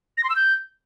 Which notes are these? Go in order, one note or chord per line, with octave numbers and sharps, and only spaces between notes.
A#6
C6
E6
G6